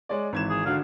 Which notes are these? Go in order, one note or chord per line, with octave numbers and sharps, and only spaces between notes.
G#3 C#5 D5
G#1 E3 G#6 E7
G#4
D3 F#4 F5